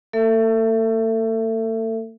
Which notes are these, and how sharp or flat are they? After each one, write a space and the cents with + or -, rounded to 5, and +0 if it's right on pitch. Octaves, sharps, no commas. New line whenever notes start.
A3 +45 A4 +30 E5 +20